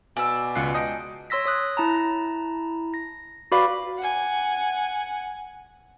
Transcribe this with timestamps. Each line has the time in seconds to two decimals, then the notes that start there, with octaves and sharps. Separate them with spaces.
0.17 B2 D5 G#5 E6
0.56 C#2 F4 F#6 C7 C#7
0.74 D#5 A5 D#6 G6 D7
1.30 C#5 C6 E6 A#6 B6
1.46 C#5 D#6 F#6
1.77 E4 A5 A#5
2.94 A#6
3.52 F#4 B4 D5 F5 B5 D6
3.97 F#5 G#5